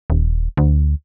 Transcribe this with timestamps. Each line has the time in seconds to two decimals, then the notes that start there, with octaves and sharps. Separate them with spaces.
0.10 D#1
0.57 D2